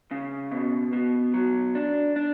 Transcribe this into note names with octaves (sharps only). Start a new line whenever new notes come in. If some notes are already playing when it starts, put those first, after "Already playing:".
C#3
B2
B2
F#3
D4
D4